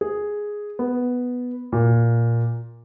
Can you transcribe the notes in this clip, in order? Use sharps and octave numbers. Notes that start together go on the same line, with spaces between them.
G#4
B3
A#2